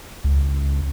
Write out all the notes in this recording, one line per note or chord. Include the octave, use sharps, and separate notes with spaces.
C#2